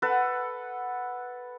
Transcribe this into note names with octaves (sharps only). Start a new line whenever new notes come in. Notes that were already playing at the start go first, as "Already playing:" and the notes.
A4 B4 F#5